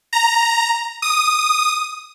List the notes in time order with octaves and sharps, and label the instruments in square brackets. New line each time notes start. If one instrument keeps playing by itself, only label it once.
[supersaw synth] A#5
D#6